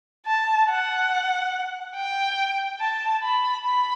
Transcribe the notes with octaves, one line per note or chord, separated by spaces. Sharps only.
A5
F#5
G5
A5
B5
B5